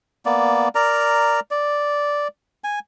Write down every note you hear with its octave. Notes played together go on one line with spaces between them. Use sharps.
A#3 B3 D5
A#4 D5 A#5
D5
G#5